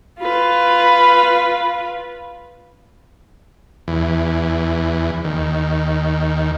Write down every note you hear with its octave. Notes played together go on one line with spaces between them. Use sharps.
F4 B4
E2
D#2